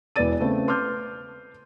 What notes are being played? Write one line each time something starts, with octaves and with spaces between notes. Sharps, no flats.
E1 B3 E4 D5 A6 D#7
C#3 A3 B3 C4
B4 C6 D6 F6 G6